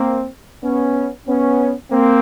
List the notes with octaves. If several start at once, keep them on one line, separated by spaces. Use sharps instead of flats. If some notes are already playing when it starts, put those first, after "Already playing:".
Already playing: A#3 C4
B3 C#4
B3 C#4
A#3 C4